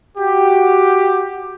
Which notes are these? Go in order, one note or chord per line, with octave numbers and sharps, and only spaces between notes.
F#4 G4